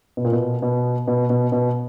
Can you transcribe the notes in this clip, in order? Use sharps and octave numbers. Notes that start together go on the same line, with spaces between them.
B2
A#2
B2
B2
B2
B2
B2